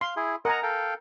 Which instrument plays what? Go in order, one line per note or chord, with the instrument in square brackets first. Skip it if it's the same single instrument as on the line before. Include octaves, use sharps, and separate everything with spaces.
[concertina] F5 [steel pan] C6
[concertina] E4 G#4
[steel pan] A#4 G#5 A#5 [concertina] D#5 F#5
[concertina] A4 F5 G5